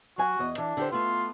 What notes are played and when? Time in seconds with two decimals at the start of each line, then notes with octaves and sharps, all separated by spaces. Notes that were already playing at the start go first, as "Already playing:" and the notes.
0.18 F#3 F#4 G#5
0.39 E2 D#5
0.58 E3 D4
0.77 D3 G4 C5
0.92 A3 B3 F4